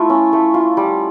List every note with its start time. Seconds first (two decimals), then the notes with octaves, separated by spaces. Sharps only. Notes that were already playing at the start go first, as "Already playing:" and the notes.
Already playing: A3 E4 F4
0.10 C#4
0.33 A3
0.54 F4
0.77 G3